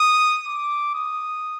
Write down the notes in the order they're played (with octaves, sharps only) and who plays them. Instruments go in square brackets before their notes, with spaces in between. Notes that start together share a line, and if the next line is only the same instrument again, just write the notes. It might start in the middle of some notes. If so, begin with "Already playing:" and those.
Already playing: [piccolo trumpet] D#6
D6
D#6